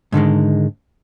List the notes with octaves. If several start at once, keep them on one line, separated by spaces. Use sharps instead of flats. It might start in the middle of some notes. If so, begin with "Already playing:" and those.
G#2 D3 D#3 G#3